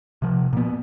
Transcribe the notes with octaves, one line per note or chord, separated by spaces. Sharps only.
C3 F3
A#2 B3